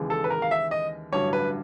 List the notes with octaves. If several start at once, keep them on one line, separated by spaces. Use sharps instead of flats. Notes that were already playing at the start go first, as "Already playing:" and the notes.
Already playing: D#2 C#3 E3 G#3
A4
B4
A#4
F5
E5
D#5
A1 G2 D3 F#3 C#5
B4